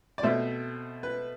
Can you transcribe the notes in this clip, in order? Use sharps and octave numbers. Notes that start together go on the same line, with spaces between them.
D5
B2 A3 C4 E5
B4